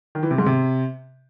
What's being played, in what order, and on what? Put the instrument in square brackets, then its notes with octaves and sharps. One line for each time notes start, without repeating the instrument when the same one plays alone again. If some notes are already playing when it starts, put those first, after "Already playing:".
[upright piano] D#3
E3
C3
G#2
C3